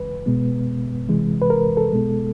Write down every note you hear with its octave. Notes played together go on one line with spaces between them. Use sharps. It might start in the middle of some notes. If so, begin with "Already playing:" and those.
Already playing: C#3 E3 G#3 B4
B2 G#3 B3
C3 E3 G#3
B4
A#4
A4
B2 G#3 B3